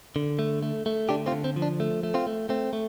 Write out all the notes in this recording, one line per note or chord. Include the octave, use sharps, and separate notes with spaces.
D3
A3
A3
A3
D3 D4 G4
C4 F4
D3
C4
F3
D4
A3
A3
C4 F4
A3
A3 C4
A3